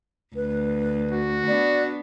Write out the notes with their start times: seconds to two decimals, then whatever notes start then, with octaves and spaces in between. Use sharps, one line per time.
0.35 D2 B4
1.11 F#4
1.47 B3 D4 D5